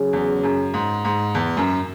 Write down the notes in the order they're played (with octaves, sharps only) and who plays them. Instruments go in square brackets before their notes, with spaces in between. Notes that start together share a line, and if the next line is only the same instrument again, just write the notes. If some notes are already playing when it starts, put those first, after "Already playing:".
Already playing: [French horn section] C#3 F#3 C#4 G#4
[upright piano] E2
F#2
G#2
G#2
E2
F#2